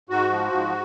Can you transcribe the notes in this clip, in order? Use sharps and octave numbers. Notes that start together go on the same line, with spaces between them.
G#2 F#4
F3
G#2